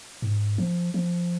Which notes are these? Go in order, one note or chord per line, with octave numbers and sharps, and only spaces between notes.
G#2
F3
F3